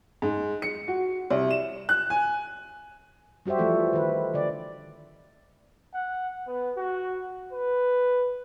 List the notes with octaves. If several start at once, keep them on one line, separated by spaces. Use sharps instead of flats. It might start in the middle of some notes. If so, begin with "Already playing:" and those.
G#2
C#7
F#4
C2
E7
F#6
G#5
G3 F#4 G4 C5 E5
E3 F3 A3 F4 A4
D#3 B4
D3 D5
F#5
B3
F#4
B4